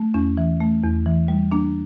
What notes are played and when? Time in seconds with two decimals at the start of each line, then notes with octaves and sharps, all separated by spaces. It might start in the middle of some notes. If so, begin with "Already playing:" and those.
Already playing: A3
0.14 E2 C#4
0.37 E3
0.60 A3
0.83 E2
1.06 E3
1.28 G3
1.52 A#3 D4